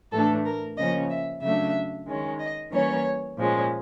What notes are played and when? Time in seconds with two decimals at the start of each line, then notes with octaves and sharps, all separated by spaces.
0.12 A2 E3 A3 D4 A4
0.46 A#4
0.77 C#3 F3 A#3 C#4 D#5
1.10 E5
1.42 C#3 F#3 A3 D4 E5
2.07 D#3 G#3 C#4
2.40 D#5
2.72 E3 G3 A#3 C#4 C#5
3.37 A#2 F3 G#3 C#4